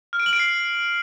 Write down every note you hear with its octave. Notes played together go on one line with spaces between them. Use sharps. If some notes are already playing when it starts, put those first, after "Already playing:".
F6
D7
F#7
D7
C7